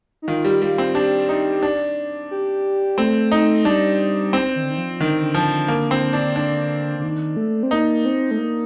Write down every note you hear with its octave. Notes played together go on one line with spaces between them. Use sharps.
D#4
D#3 F4
G3
G3 F4
C4
D4 G4
D#4
D4
G4
A3 C4
D#4
G3 D4
C4
D#3
D3
D#3
F3
D3 D#3
D3
F3
A#3
C4
D4
D4
D3
D#3
A3
C4
A#3 D#4
C4
A3
A#3